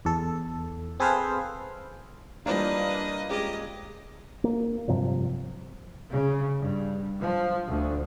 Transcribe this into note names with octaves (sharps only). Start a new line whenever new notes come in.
E2 A4
C4 G#4 A4 B4 C5 F5
E3 G3 A#3 D4 F4 B4 D#5
G#3 C#4 G4 D#5
A#3
G2 C3 F3 F#3
C#3
G2
F3
D2